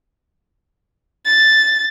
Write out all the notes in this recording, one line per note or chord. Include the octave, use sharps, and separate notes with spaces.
A6